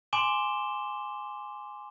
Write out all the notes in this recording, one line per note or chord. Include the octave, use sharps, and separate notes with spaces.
G#5 C6 D6 E7 G7